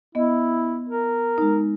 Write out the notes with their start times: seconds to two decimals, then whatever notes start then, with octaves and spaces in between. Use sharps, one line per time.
0.15 B3 E4 D#5
0.89 A#4
1.38 G#3 D#4